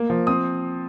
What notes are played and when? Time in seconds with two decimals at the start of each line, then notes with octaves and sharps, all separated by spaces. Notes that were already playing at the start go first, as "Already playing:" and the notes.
Already playing: A#3
0.10 F3
0.27 C4 D#6